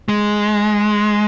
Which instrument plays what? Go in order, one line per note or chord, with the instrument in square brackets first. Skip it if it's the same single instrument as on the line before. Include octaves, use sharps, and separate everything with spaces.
[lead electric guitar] G#3